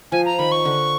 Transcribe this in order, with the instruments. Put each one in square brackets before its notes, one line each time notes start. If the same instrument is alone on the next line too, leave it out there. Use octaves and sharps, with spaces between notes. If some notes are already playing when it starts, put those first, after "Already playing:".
[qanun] F3 [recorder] G#5
[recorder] A#5
[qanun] D#3 [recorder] B5
[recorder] C#6
[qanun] D3